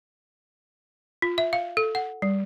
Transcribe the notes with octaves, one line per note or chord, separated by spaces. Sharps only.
F4
E5
F5
A4
F#5
G3